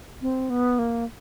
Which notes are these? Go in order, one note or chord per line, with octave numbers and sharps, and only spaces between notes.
C4
B3
A#3